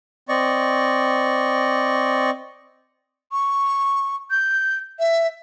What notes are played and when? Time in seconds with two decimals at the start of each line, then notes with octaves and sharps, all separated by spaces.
0.29 C4 D5 D#5 C#6
3.32 C#6
4.31 G6
5.00 E5